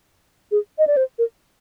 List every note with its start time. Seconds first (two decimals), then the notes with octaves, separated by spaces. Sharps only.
0.51 G#4
0.78 D#5
0.87 D5
0.97 C5
1.19 A#4